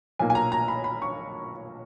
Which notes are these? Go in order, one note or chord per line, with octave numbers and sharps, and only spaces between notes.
B1 A#2 A#3 G#5
G#5
A#5
A#5
B5
B5
C#6